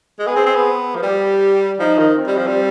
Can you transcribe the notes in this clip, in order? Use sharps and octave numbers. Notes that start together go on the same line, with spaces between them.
G#3
B3 G#4
C4
C4
B3
F3
G3 G4
F3 D#4
D#3
C4
G3
F3
G3